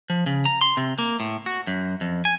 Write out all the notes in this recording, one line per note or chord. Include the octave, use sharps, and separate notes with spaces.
F3
C#3
A#5
C6
C3
A#3
A2
F#4
F#2
F2
G#5